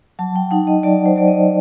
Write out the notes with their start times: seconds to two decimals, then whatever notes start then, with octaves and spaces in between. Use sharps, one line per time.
0.19 F#3 A5
0.36 G5
0.51 D#4 F#5
0.67 D#5
0.83 F#3 D5
1.06 C5
1.16 F#3 D5
1.28 D#5